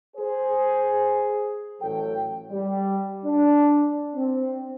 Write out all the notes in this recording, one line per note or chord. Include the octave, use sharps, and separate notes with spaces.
G#4 C5
A1 A2 F#3 A4 G5
G3
D4
C4